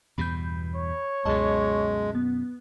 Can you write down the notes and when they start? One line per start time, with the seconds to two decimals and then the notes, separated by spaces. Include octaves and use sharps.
0.18 E2 G2 B2 B5 G6
0.76 C#5
1.25 C#2 F#2 B2 G#3 D#5 A5
2.15 B3